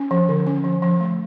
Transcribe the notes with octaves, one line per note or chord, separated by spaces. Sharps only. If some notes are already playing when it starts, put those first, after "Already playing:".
Already playing: C#4
F3
D3
C#4
F3
F3
A3